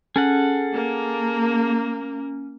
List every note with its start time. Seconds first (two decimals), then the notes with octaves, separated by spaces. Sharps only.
0.16 C#4 G#4 A4 F#5
0.71 A#3